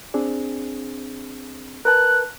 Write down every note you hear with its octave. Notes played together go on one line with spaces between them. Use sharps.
C4 D4 G#4
A#4 B4 A5 F#6